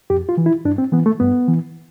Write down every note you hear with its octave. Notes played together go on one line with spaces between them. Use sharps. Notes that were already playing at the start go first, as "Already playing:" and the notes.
F2 G4
F4
E3
E4
G2 D4
C4
E3 B3
A3
G2 B3
E3